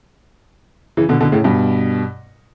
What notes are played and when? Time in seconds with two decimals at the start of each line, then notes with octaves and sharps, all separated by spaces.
0.97 C#3 E3
1.09 B2 D3
1.21 B2 D3
1.32 A2 C#3
1.44 G2 B2